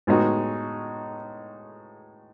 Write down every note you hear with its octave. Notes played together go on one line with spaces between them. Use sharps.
A2 G#3 B3 D#4 F#4